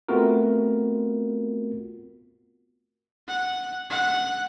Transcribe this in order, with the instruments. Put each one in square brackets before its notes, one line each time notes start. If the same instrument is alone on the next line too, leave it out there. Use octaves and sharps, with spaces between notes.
[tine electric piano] A3 B3 C4 F4 F#4 A#4
[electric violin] F#5
F#5